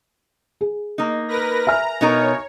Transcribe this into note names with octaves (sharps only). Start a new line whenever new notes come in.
G#4
A#3 D#4
A#4 B4 A#6
E5 G#5 A#5 F6
B2 D#4 A#4 C#5